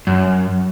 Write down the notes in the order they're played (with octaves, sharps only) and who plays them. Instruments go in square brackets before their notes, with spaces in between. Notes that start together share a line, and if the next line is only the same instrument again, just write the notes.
[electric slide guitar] F#2